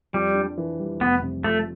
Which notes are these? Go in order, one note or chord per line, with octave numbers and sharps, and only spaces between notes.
F2 G3
D4
E3
G3
F1 B3
C3
F2 A3